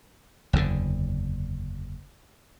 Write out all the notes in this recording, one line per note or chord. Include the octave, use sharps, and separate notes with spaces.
F#1 E2 G2 D3